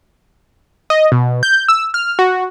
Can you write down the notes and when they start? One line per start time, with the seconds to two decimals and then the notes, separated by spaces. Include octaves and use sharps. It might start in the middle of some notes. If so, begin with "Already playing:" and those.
0.90 D#5
1.12 B2
1.43 G6
1.68 E6
1.94 F6
2.19 F#4